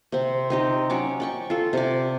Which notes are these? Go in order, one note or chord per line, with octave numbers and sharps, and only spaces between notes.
C3 C4
C4 D#4 G4
F#3 C#4 C#5 D6
D5 G5 C#6
F4 A4
C3 D5